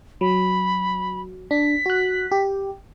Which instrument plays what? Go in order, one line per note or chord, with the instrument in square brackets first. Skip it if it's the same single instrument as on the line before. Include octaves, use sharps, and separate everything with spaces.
[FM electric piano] F#3 [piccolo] B5
[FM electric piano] D4 [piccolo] B6
[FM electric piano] F#4 F#6
G4